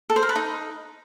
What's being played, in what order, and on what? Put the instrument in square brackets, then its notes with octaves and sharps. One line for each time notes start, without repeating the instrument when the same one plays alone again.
[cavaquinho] A4
C5
A#4
B4
D#4